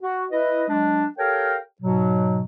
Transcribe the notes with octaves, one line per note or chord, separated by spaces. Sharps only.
F#4
E4 B4 D#5
F#3 G#3 D4
G4 A4 A#4 C#5 F5 G5
G#2 B2 F#3